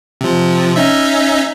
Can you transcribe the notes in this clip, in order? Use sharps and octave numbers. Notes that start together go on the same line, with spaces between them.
C3 F3
C#4 D#4 E5